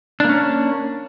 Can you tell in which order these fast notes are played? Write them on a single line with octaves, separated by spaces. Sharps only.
D4 A#3 C#4